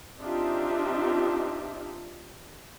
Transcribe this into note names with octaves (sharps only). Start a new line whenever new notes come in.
C4 D4 D#4 F4 G4 E5